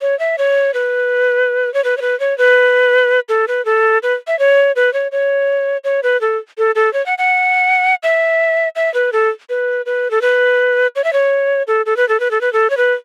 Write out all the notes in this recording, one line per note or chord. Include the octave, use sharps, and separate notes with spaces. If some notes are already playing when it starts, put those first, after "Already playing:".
C#5
E5
C#5
B4
C#5
B4
C#5
B4
C#5
B4
A4
B4
A4
B4
E5
C#5
B4
C#5
C#5
C#5
B4
A4
A4
A4
C#5
F#5
F#5
E5
E5
B4
A4
B4
B4
A4
B4
C#5
E5
C#5
A4
A4
B4
A4
B4
A4
B4
A4
C#5
B4